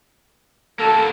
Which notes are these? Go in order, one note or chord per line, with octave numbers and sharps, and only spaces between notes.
A#3 F#4 A4